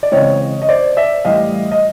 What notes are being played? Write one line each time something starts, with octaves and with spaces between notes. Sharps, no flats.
D5
C#3 E3 G#3 C4 C#5 D#5
D#5
C5 D5
D5 E5
A2 E3 G3 D#5 F5
D#5